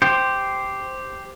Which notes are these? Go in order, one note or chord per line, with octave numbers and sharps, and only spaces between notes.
G4 C5